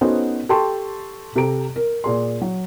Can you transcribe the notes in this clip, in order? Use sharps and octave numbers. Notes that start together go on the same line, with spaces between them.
B3 C#4 D#4 F#4 A4 C5
G4 A4 G5 A5 C6 C#6
C3 G4 A4 A#5 D7
A#4
A#2 G#4 C6
F#3